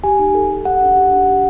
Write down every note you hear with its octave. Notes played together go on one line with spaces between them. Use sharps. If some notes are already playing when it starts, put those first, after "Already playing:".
G4 G#5
D#4
A4
A4
G4 F#5
D4
G4
D4
G4